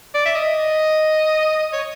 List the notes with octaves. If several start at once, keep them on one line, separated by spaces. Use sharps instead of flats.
D5
E5
D#5
C#5